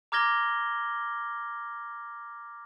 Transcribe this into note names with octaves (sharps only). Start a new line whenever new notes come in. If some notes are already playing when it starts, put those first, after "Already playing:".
A#5 D6 F6 G#6 A#6 G7